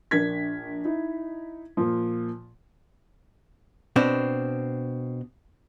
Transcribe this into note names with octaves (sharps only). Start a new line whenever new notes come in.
A#1 D4 A#4 G#6 B6
D#4 E4
A#2 F3
B2 C4 D4